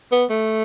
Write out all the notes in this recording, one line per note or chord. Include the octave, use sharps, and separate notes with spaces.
B3
A3